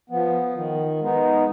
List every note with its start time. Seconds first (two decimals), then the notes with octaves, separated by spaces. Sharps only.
0.10 F3 B3
0.55 D#3
1.00 G#3 B3 D#4